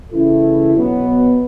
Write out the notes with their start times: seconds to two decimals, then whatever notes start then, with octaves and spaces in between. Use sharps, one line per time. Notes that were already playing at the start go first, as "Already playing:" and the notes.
0.11 C#3 E3 A3 E4
0.75 B2 F#3 B3